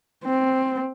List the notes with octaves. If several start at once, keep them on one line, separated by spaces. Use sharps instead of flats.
C4